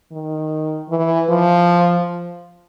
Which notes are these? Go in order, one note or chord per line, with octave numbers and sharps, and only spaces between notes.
D#3
E3
F3